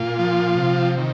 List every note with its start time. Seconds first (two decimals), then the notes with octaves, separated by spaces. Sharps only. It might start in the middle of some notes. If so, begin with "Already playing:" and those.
Already playing: A#2 F4
0.19 F3
0.58 C3
0.98 D#3